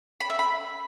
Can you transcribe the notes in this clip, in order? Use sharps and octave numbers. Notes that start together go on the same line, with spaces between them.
B5
E5
B5